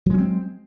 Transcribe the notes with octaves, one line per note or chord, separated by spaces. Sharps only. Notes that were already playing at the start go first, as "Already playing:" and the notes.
F#3 G#3 C4 C#4